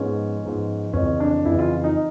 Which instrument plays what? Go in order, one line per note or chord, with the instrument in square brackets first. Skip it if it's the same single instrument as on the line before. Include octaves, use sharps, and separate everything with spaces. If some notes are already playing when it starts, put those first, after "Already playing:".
Already playing: [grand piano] G#2 F3 G#3 B3 C#4
G#2 F3 G#3 B3
F2 C#3 E3 C#4
D4
F2 C#3 E3 E4
F4
D#4